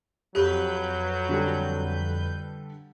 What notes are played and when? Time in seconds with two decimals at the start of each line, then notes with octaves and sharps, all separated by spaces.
0.35 F2 F#3 G4 B4 G6
1.29 D3 G3 A4